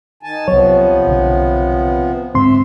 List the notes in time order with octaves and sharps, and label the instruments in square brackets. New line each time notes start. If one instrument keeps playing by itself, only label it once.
[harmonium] D#3 G#5 A5
[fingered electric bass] C2 F#3 [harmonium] C3 F3 B3 [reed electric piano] C#5
[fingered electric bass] B1 D3
[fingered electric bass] G#2 D3 [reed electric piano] C4 C6 [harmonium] E5